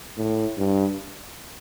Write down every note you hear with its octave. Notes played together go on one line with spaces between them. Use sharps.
A2
G2